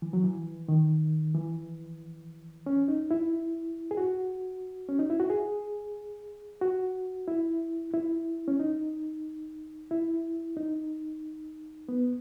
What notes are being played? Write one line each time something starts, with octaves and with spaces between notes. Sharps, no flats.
E3
F#3
E3
D#3
E3
C#4
D#4
E4
G#4
F#4
C#4
D#4
E4
F#4
G#4
F#4
E4
E4
C#4
D#4
E4
D#4
B3